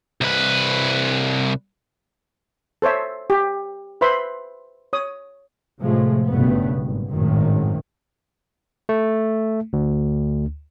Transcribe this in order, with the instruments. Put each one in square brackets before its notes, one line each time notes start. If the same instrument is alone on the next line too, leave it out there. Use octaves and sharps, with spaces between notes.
[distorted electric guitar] C2 B4
[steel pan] A4 C5 C#5 E5
G4
B4 C5 E5 B5 C6
C#5 D#6
[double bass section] A2 C3 F3 G#3 A3
F#1 G2 B2 A3 B3
G#1
G#1 F#2 A2 D#3
[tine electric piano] A3
D2